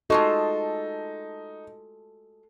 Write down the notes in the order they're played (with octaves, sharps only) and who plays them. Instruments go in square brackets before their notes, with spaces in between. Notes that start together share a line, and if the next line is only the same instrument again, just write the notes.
[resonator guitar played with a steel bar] G#3 F4 F#4 [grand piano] D#4 [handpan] A4